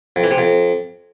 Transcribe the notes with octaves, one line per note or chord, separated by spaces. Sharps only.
F2
E3
C3
F2